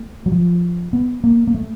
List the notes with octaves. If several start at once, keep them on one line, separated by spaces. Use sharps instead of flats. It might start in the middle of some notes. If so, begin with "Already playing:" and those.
Already playing: A3
F#3
F3
B3
A#3
A#3
A3